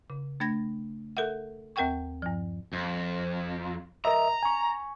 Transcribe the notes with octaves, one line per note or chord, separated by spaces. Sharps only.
C#3
A3 D4 G#6 A#6
A4 A#4 E5 F#5
D#2 C4 A#4 F#5 G5 C#6
G2 F3
F2
A#4 D#5 E5 A#5
G#5 C#6